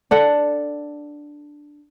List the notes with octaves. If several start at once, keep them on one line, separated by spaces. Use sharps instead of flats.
D4 A4 F#5